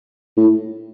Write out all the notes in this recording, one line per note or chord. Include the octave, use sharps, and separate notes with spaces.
A2